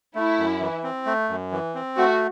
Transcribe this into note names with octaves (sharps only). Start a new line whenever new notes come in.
A3 E4
F#2
E3
C4
A3
F#2
E3
C4
A3 F#4